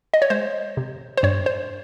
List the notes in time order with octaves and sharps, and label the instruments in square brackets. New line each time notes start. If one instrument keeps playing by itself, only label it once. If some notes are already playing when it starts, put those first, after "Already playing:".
[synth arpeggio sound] D#5
C#5
G#3 C5
C3
C5
G2 C#5
C5